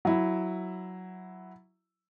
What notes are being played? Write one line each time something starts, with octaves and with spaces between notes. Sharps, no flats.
F#3 E4